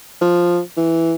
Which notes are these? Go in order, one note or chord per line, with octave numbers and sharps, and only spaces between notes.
F3
E3